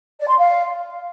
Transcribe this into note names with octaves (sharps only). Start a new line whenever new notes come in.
D5
C6
F5